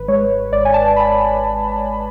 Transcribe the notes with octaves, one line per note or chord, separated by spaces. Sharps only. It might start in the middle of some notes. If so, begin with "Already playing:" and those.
Already playing: G#1 B4
G#3 C#5
G#1 D5
G#5
A5
B5